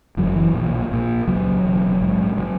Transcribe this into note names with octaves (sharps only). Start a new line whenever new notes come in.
F#1 E2 C#3 F#3
E3
B1 A#2
A#1 A#2
C#2 C#3 F#3
E1 E2 C#3
A#1 G#2
C#3 F#3